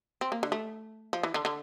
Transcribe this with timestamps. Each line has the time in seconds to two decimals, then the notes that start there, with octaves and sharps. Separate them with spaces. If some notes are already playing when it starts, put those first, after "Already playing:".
0.21 C4
0.32 A#3
0.43 D3
0.52 A3
1.13 F3
1.23 E3
1.34 D3
1.45 D3